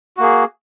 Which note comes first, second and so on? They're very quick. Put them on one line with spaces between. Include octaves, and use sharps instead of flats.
F#4 A#3 G#4